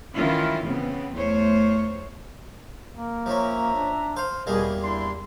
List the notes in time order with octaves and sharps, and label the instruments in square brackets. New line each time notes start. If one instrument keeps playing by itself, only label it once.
[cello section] D#3 E3 C#4 E4 F4
C#3 B3 C4
E2 A3 C5 C#5
[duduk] A#3
[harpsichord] F3 C#4 [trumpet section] E5 A#5
[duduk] D4
[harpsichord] C5 F5
[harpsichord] E2 G3 A#3 [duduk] B2 [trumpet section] G#4
[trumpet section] D4 C6 [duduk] E4